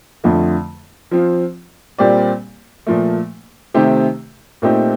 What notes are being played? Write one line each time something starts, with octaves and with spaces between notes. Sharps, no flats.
F2 D3 F3 A3
F3 C4 F4
A#2 G3 C4 G4 D5
A#2 F3 A3
C3 D#3 A3 C4 G4
A#2 A3 C4 D#4 G4